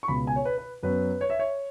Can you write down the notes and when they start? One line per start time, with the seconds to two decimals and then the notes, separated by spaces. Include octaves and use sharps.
0.03 C#6
0.08 C#2 B2 B3 B5
0.27 G#5
0.36 C#5
0.45 B4
0.58 B4
0.83 F#2 F#3 B3 B4
1.21 C#5
1.30 E5
1.39 C#5